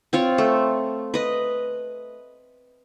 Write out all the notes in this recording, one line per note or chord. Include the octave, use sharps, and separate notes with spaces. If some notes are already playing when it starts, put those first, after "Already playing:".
C4 F4 C#5
A3
B4 D#5